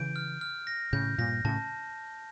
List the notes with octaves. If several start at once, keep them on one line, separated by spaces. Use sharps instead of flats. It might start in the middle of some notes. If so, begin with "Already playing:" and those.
Already playing: C#3 E3 G6 D7
F6
F6
A#6
A2 C#3 G6
G2 A#2 A#6
A2 C#3 A5